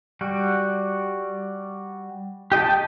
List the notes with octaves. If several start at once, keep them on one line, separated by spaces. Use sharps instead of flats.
G3 F#4
G4 D#5 G5 A5